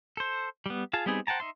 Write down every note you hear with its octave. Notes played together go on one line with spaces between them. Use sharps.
A4 C5
G3 B3
F4 G#4 A5
G3 B3 C4 D#4 G#4
C5 F#5 G5 A5 A#5
D#4 E5 C6